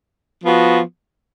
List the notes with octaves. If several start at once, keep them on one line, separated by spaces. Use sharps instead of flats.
F3 B3 F#4